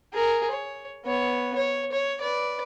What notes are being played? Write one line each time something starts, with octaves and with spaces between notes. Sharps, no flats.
G#4 A#4
C#5
B3 C#5
C#5
C#5
B4 D5